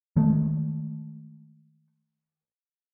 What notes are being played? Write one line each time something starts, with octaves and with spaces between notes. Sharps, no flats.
D#3 G#3 A3